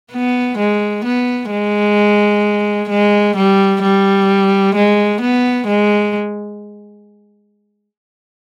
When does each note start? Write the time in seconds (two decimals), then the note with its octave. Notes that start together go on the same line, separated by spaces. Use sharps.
0.13 B3
0.58 G#3
1.05 B3
1.51 G#3
2.89 G#3
3.36 G3
3.82 G3
4.75 G#3
5.21 B3
5.67 G#3